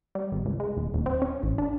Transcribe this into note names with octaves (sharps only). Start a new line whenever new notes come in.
G3
G#1
C#2
G#3
D#1
D#1
C4
C#4
A1
D4